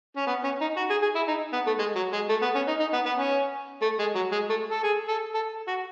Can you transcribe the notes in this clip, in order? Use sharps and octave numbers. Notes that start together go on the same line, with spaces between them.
C#4
B3
C#4
D#4
F#4
G#4
G#4
E4
D#4
B3
A3
G#3
F#3
G#3
A3
B3
C#4
D#4
D#4
B3
B3
C#4
A3
G#3
F#3
G#3
A3
A4
G#4
A4
A4
F#4